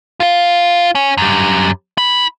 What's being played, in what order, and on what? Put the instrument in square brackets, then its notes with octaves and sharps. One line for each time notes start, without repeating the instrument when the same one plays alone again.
[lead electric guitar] F4 F5
C#4
F#2 G3
E4 B5